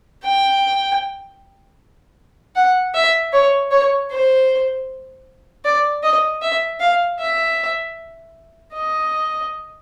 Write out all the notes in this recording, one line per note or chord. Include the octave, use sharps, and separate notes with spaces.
G5
F#5
E5
C#5
C#5
C5
D5
D#5
E5
F5
E5
D#5